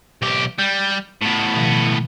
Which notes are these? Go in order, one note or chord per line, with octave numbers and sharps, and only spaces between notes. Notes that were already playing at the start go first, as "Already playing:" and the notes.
B1 G4
G3 G6
A2 B3
B2 D#3 F3